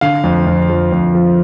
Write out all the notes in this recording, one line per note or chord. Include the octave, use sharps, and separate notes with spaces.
D3 F5
F2
F2
F3
F2
F3